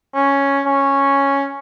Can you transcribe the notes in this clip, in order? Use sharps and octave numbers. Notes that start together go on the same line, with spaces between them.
C#4
C#4